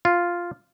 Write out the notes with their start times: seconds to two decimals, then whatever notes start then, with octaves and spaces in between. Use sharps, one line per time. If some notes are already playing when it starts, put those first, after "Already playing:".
0.05 F4